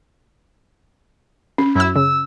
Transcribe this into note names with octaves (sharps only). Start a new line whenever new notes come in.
C#4
F#2 E4 E6
C#3 E6